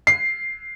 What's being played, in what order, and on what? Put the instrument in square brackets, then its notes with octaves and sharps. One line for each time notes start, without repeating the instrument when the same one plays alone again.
[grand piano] C7